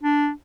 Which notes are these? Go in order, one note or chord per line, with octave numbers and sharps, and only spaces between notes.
D4